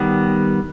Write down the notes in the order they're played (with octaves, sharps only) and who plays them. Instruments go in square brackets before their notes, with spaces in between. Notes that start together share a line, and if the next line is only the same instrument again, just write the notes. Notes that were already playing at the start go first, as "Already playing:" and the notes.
Already playing: [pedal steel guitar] D#3 G3 B3